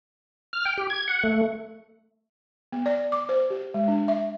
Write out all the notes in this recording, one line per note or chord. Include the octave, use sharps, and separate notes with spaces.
F6
G5
G4
G#6
F#5
A3
B3
D5
D6
C5
G4
G#3
D4
E5